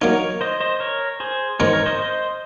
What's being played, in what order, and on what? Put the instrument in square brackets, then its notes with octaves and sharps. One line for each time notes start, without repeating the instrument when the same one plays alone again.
[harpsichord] F#3 A#3 D#4 [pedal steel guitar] A#4 C#5
[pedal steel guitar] C5 D#5
C5 D#5
A#4 C#5
G#4 C5
[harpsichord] G#2 D#3 G#3 C4 [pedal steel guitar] A#4 C#5
[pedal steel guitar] A#4 C#5
C5 D#5
C5 D#5